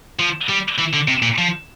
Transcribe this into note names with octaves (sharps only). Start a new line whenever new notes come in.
F3
G3
E3
D3
C3
A#2
F3